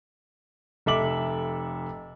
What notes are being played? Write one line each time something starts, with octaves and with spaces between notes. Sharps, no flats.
F1 A4 E5 D6 F#7